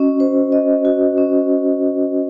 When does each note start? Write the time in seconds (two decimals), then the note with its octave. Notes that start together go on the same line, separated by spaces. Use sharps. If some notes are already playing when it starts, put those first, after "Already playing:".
Already playing: C#4 F#4 D#5
0.20 C5
0.52 D#5
0.85 F#4
1.18 C#4